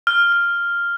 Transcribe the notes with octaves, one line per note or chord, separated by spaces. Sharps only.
F6
F6